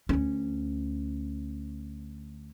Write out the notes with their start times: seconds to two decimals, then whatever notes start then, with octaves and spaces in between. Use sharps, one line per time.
0.09 D2 C#4